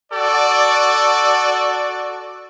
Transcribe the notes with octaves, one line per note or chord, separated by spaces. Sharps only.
F#4 A4 D5